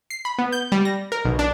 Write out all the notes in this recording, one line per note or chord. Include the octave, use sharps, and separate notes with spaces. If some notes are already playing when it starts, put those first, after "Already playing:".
C7
B5
B3
G6
G3
A#6
A#4
B1
D4